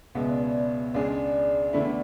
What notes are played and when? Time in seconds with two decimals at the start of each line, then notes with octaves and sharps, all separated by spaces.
0.15 C#2 B2 G#3 B3 E5
0.28 D5
0.42 C#5
0.54 C#5
0.81 C#5
0.94 C#2 C#3 G#3 D4 G#4 D5
1.65 E5
1.73 E2 D3 A3 E4 D5